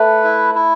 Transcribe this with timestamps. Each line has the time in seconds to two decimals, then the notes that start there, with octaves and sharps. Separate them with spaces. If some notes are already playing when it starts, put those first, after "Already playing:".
Already playing: A3 B4
0.24 E4
0.55 E4